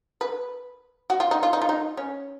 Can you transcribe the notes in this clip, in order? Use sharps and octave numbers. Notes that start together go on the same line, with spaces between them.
B4
F#4
F4
D#4
F4
D#4
F4
D#4
C#4